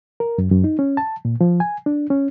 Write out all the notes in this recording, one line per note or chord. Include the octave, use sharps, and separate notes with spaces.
A#4
F#2
F#2
D#4
C#4
A5
A#2
F3
G#5
D4
C#4